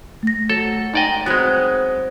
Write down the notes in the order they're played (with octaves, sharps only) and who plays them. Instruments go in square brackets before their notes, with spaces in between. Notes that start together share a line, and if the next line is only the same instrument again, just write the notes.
[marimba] A3 A#6
[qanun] F#3 [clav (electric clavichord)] A4
[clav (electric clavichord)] G#2 D5 D#5 [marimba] D#4 G5
[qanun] F#3 C4 [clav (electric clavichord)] G#3 B3